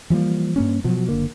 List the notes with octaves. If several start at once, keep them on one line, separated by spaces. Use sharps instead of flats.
E3 F3 G3 A#3
G2 A#3 C#4
B2 F3 F#3
F#1 D3 A#3